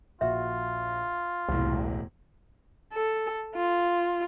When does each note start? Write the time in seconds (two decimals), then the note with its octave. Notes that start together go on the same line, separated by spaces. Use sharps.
0.21 A#1 F4 F#4 E5
1.48 E1 C2 A2
2.93 A4
3.55 F4